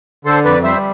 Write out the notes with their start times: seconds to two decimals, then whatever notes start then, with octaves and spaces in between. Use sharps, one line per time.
0.25 D3 A4 C5
0.45 F2 B4 D5
0.64 G3 C5 E5